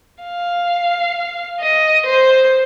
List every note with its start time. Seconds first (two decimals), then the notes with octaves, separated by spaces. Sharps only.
0.23 F5
1.60 D#5
2.06 C5